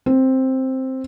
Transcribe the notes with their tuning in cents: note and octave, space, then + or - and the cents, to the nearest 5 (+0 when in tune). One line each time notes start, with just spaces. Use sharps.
C4 +5